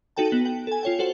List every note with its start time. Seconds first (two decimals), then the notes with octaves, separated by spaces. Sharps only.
0.16 D#4 F#4 A4 G5 A5
0.32 B3 F#7
0.45 G5
0.67 A4 G#5
0.83 F4 C#5 G5
0.99 F#4 A4 C5 F#5